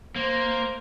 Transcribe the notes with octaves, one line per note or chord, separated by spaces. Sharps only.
A#3 C5